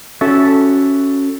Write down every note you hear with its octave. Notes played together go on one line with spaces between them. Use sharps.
C#4 F#4 A4 E5